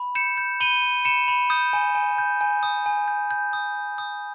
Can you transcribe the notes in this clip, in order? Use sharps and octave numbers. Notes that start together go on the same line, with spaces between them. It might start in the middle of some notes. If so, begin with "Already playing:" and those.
Already playing: B5
G6 C#7 E7
G6
B5 D#7 G7
B5
B5 C#7 E7
B5
D#6 G6
G#5
G#5
G6
G#5
D#6
G#5
G6
G6
D#6
D#6
D#6